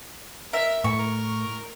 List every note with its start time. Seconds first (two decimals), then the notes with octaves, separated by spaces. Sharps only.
0.53 A#4 E5
0.84 A2 E4 C#6
0.99 A#4